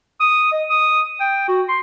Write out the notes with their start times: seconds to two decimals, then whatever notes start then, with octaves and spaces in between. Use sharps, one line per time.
0.20 D#6
0.52 D#5
0.70 D#6
1.20 G5
1.48 F#4
1.69 C6